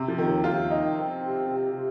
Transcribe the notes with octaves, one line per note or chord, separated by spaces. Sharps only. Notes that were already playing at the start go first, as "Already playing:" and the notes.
Already playing: C3
F3
D#2 D#3
D#2 F4
D#3 D#4
C4
C3
C3
C3